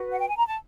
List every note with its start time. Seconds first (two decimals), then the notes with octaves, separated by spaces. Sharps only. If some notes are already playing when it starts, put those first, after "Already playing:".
Already playing: F#4 B4
0.12 F#5
0.20 G5
0.28 G#5
0.37 A#5
0.47 A5